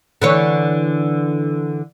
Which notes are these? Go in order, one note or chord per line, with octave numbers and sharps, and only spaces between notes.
D3 E3 C#5